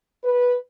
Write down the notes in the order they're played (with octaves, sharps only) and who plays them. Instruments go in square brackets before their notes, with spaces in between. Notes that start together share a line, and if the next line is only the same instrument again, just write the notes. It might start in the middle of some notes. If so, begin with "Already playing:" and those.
[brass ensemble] B4